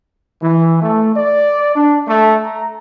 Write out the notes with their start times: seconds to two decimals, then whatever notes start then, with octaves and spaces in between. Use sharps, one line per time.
0.41 E3
0.81 A3
1.16 D5
1.75 D4
2.07 A3
2.44 A#5